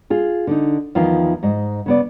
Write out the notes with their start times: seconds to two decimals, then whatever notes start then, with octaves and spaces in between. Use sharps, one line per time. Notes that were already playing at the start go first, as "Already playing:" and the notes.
0.10 F4 G#4
0.47 D3 D#4
0.95 E2 D#3 F3 F4
1.43 G#2 D#5
1.86 C#3 B3 D5